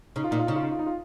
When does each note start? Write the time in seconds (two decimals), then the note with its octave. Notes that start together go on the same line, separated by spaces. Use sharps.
0.16 C#3 D#4
0.24 F4
0.31 A#2 D#4
0.39 F4
0.47 C#3 D#4
0.56 F4
0.63 D#4
0.71 F4
0.79 D#4
0.86 F4